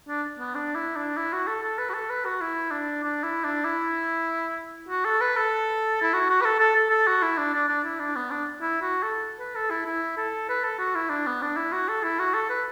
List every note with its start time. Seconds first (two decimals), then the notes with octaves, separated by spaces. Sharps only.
0.08 D4
0.39 B3
0.55 D4
0.75 E4
0.96 D4
1.17 E4
1.33 F#4
1.47 A4
1.63 A4
1.78 B4
1.90 F#4
1.94 A4
2.10 B4
2.25 F#4
2.41 E4
2.72 D4
3.04 D4
3.24 E4
3.45 D4
3.65 E4
4.89 F#4
5.05 A4
5.21 B4
5.36 A4
6.02 E4
6.13 F#4
6.30 F#4
6.41 B4
6.45 A4
6.60 A4
6.76 A4
6.91 A4
7.07 F#4
7.22 E4
7.38 D4
7.54 D4
7.68 D4
7.84 E4
8.00 D4
8.16 B3
8.31 D4
8.61 E4
8.82 F#4
9.03 A4
9.39 B4
9.55 A4
9.71 E4
9.86 E4
10.17 A4
10.49 B4
10.64 A4
10.79 F#4
10.95 E4
11.10 D4
11.26 B3
11.42 D4
11.57 E4
11.72 F#4
11.89 A4
12.04 E4
12.19 F#4
12.34 A4
12.50 B4